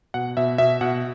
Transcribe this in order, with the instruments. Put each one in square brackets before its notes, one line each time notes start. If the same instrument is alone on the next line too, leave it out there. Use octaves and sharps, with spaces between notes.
[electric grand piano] B2 F#5
B2 E5
B2 E5
B2 F#5